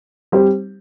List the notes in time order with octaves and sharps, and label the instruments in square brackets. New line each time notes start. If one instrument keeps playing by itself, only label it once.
[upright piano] G3 C4 G4 C5